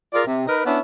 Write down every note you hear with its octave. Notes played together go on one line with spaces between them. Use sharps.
F4 G#4 A#4 D5
C3
D#4 A#4 B4
B3 C#4 D4 E4